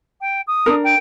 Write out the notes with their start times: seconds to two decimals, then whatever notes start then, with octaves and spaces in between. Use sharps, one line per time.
0.21 G5
0.47 D#6
0.66 D4 D#4 A#4
0.83 G5